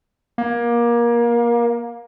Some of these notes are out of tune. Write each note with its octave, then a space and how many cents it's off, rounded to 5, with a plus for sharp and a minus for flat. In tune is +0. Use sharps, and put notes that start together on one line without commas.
A#3 +25